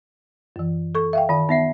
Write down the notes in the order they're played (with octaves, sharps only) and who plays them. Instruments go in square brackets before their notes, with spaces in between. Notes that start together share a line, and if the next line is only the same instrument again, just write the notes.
[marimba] F#2 E3
A4 C#6
E5 F5 G5
[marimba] D#3 [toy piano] F4 A5
[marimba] B3 [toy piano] D#4 E5 F#5